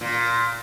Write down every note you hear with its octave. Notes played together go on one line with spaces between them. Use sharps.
A#2